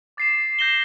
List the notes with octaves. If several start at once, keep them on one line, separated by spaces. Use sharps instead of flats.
D6 A6 C7 E7
G6 A#6 E7 G7